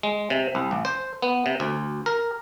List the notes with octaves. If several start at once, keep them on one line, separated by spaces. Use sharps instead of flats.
G#3
C3
C2
A1
C5
B3
C3
D2
A#4